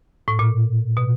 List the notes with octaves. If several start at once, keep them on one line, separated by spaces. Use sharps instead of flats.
A2
A#2
B2